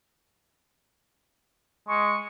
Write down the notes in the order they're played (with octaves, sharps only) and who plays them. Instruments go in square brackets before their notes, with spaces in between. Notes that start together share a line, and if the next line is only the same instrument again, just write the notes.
[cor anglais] G#3 [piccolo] C#6